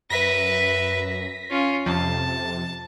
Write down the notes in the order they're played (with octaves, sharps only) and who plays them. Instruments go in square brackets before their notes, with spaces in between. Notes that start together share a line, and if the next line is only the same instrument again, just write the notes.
[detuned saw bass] F#2 [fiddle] B4 E5 [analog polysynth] A#6 B6
[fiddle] C#4 F4
[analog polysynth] F2 [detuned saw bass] C3 [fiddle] A5